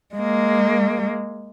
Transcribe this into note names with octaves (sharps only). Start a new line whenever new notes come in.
G#3 A#3